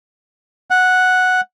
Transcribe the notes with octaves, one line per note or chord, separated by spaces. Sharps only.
F#5